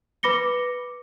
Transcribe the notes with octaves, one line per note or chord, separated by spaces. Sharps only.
B4 B5 D6 A#6 C#7 G7